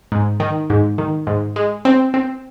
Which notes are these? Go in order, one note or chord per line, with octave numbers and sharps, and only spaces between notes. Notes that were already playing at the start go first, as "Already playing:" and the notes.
G#2
D#3
G#2
D#3
G#2
G#3
C4
C4